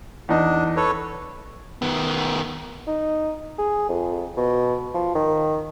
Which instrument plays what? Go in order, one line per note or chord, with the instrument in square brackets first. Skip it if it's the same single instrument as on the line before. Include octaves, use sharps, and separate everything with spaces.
[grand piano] E2 D#4 [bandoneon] D4
[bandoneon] A4 B4 C#5
[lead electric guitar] D#3 B3
[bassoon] D#4
G#4
F2
B2
F3
D#3